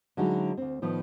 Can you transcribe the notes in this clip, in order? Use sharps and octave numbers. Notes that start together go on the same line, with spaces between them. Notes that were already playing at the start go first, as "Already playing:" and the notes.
D3 F#3 G#3 C#4 D#4 E4
D2 C4
A2 D#3 F3 B3